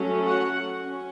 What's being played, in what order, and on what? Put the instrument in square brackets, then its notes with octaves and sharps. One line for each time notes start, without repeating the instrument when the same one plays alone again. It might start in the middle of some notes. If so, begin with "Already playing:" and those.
Already playing: [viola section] F#3 A3 C#4
F#4 F#5
C#4